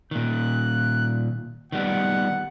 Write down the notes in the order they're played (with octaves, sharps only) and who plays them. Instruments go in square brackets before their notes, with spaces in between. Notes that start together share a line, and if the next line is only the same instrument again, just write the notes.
[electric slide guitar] A#2 D#3 [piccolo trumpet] F#6
[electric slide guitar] D#3 G3 B3 [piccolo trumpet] F#5